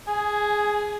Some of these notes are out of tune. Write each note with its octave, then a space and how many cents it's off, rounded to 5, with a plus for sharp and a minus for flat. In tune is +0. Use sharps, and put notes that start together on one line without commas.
G#4 +0 G#5 +25